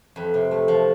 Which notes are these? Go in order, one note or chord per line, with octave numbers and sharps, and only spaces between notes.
F2 B4
C3
A3
F3